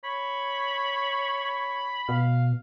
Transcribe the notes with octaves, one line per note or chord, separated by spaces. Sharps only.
C#5 B5
B5
B2 F5